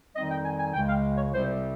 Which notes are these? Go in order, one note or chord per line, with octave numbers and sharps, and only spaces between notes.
F2 D#3 G3 C4 D#4 D#5
G5
G#5
G#5
C#2 C#3 G#3 G5
F5
C#5
C2 C3 G3 C4 C5